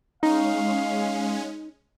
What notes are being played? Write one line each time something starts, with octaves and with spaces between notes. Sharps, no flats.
G#3 C#4 D#4 F5